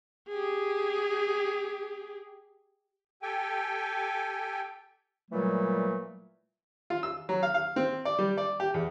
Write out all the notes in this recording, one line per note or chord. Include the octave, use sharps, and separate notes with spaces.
G4 G#4
G4 A4 G5 G#5
A#2 E3 F#3 G3 A3
F4
E6
F#3
F5
F5
C4
D5
G3
D5
G4
E2